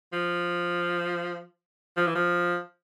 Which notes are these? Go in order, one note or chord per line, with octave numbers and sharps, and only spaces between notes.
F3
F3
E3
F3